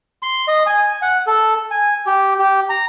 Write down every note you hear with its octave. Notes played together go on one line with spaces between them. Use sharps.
C6
D#5
G#5
F#5
A4
G#5
G4
G4
A#5